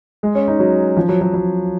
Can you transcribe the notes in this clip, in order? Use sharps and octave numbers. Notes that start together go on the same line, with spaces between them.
G#3
C#4
D#4
F#3
F3
F#3
F#3
F#3